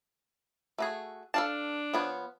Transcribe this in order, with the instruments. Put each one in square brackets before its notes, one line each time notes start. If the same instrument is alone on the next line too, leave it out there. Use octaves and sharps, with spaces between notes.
[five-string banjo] A3 F#4 G#4
[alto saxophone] D4 [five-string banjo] A4 F5 A5
[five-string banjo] F3 B3 C#5